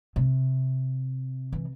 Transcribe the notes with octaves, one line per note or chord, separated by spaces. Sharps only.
C3
E3